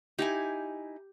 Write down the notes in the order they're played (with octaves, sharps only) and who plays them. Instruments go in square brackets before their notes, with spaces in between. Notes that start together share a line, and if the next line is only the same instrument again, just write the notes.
[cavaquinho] D#4 E4 G#5 [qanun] G4